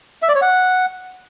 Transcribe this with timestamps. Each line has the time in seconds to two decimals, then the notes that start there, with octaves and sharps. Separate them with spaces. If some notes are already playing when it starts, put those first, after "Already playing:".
0.22 E5
0.29 D5
0.35 C#5
0.41 F#5